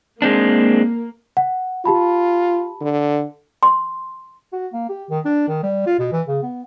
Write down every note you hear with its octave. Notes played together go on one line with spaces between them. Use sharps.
G#3 A#3 C4 D4
F#5
F4 G4 A5 B5
D3
C6
F#4
A#3
G4
D#3
D4
D#3
G3
F4
B2
E3
C#3
B3